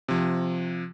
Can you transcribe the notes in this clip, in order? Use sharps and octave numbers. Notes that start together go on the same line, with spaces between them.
C3 F3